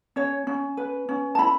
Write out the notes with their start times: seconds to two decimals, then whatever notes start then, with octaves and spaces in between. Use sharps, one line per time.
0.16 C#4 C#5
0.47 C#4
0.77 B4
1.09 C#4
1.35 A5
1.39 E4 B5